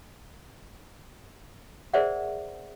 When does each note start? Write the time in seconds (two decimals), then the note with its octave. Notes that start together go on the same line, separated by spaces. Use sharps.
1.94 G#4 A#4 C5 D5 E5 F#5